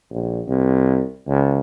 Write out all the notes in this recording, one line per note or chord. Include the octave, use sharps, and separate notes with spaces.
A#1
C2
C#2